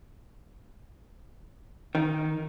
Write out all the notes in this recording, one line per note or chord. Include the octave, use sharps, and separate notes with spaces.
D#3